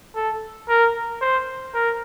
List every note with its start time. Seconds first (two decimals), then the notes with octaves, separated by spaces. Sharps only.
0.16 A4
0.69 A#4
1.21 C5
1.74 A#4